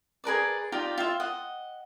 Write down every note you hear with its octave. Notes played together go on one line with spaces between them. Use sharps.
G#4 A#4 B4 D5
D#4 F4 G4 D5
F4 E5
D#5 F#5